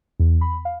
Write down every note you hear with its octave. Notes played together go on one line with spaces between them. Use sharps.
E2
B5
F5